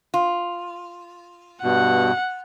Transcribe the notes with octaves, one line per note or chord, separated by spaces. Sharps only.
F4
G2 B2 F#5